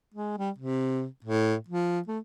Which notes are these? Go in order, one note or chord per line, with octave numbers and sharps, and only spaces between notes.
G#3
G3
C3
A2
F3
A3